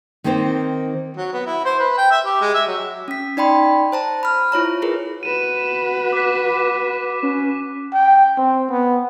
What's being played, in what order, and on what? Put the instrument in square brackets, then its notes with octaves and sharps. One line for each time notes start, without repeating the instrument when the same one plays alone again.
[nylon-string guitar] D#3 A#3 C4 D#4 C5
[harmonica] F#3
B3
E4
C5
B4
G5
E5
G4
G#3
E5
F#3
[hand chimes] C#4 B6
D#4 D5 G5 B5 C6
C5 A5 A#5
B5 F6
E4 F4 C#5 A#5
G#4 A#4 B4
[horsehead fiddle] F#4 B4 [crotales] D#7 E7
[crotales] D6 F#6 B6
[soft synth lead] C#4
[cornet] G5
C4
B3